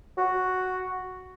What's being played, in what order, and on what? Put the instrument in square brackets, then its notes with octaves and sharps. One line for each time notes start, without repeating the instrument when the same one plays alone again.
[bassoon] F#4